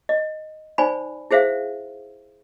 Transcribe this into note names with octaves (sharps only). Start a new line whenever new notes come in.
D#5
D#4 C5 D5 G#5 B5
E4 G#4 C5 E5 F5